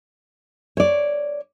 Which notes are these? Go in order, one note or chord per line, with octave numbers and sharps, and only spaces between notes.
C#5 D5